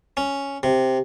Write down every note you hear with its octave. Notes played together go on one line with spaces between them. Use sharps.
C#4
C3